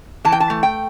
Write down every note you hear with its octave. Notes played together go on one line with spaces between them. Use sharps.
E3 A5
G5
A5
A3
G5